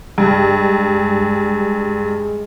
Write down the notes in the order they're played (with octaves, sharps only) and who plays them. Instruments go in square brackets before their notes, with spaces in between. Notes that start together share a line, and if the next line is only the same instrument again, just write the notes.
[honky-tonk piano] G2 [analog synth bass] G#3